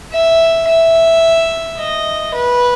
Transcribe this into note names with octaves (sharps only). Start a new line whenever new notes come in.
E5
E5
D#5
B4